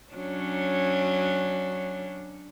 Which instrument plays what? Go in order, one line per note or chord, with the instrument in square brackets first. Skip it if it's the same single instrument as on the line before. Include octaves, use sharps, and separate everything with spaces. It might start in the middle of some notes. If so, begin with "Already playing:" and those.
[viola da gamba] F#3 C#4 D4